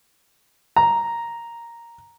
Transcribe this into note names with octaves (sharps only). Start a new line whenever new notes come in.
A#5